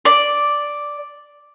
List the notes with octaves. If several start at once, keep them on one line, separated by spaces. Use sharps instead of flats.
D5